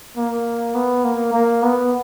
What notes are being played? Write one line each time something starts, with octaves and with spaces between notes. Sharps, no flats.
A#3
B3
A#3
A#3
B3